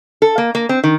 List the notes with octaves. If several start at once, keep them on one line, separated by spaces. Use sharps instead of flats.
A4
A#3
A#3
C4
D#3